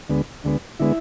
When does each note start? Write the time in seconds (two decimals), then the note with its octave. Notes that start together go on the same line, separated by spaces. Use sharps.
0.09 D2 D3 G#3 B3
0.44 D2 D3 G#3 B3
0.80 D3 G#3 B3 E4